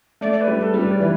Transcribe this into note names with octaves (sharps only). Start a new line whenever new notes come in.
A3 D5
D5
B4
G3
A4
G3
B4
D5
E3 B4